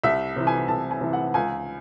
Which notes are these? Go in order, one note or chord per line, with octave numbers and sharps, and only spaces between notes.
C2 E5
C3 E3
G#5
C2 A5
G#5
C3 E3
F#5
C#2 G#5